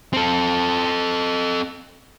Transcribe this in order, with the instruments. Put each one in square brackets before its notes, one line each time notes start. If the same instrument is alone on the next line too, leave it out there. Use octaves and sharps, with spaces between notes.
[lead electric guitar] C4 A4